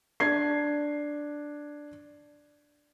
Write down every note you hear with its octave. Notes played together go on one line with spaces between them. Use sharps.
D4 G#6 C7